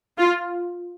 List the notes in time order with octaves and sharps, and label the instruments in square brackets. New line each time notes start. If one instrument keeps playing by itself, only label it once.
[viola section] F4